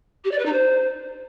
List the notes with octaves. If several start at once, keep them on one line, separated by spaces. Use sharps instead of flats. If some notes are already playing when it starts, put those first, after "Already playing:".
G4
D5
B4
D#4
C5